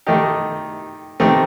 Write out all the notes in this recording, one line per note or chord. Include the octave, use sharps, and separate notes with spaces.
D#3 A3 D#4 G4
D#3 A3 C4 D#4 G4